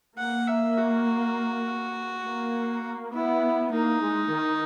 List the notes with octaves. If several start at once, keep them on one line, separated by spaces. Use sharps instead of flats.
A#3 F#5
E5
F#4
A#3
B3 E4
A#3 D#4
G#3
D#3